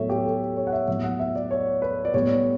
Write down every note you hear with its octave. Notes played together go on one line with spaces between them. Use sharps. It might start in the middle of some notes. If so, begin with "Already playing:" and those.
Already playing: A2 F#3 B3 A4 C#5 E5
G4
A4
C#5
F#5
E5
A2 F#3 B3 E5
F#5
E5
D5
C#5
B4
D5
A2 G3 B3 C#5